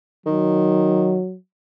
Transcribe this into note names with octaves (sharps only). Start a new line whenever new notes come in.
D#3 F#3